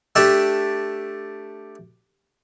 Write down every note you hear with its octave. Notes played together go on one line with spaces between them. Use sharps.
A3 D4 G4 D5 E5